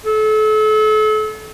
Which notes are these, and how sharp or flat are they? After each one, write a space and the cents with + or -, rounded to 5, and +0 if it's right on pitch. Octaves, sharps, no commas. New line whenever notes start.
A4 -35